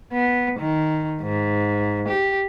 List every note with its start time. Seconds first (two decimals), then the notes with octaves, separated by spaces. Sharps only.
0.13 B3
0.59 D#3
1.22 G#2
2.08 G4